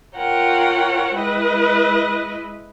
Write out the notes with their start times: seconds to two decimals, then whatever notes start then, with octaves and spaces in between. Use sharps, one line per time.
0.16 F4 A#4 C#5 F#5 G5
1.15 G#3 E4 B4 D#5